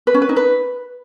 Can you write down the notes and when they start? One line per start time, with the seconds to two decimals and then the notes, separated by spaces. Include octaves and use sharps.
0.07 B4
0.14 C#4
0.22 B4
0.29 D#4
0.36 B4